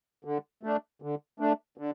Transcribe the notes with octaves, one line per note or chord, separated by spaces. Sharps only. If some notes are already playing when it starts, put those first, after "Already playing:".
D3
A3 D4
D3
A3 D4
D3